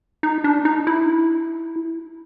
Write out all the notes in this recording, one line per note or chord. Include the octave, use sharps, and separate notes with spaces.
D#4
D4
D#4
E4